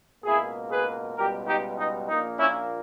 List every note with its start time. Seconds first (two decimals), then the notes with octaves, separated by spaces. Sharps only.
0.24 C#2 B2 A#3 E4 G#4
0.70 G#4 B4
1.16 C#2 B2 G3 G4 A#4
1.47 D#4 G4
1.78 D#4
2.09 A#1 A#2 A#3 D#4
2.39 C#4 E4